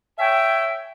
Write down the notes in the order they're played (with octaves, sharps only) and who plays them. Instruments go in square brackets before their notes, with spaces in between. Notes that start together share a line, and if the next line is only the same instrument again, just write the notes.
[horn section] C#5 E5 G#5 [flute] G5